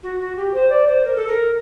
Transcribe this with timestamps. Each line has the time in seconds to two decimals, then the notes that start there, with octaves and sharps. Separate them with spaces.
0.03 F#4
0.20 F#4
0.36 G4
0.53 C5
0.69 D5
0.87 C5
1.03 A#4
1.16 A4
1.27 A#4